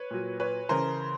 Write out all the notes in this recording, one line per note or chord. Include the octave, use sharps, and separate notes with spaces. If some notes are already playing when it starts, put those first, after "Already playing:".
Already playing: B4 C#5
A#2 F#3
B4 C#5
C#3 E3 A#4 C5